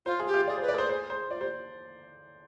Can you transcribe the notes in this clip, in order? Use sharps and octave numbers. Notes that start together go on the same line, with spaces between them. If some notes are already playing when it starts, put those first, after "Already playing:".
F4 C5
G#4
G4
F4
G#4 D5
C5
B4
D5
G#4 C5
C5
C5
F4 D5
G4 C5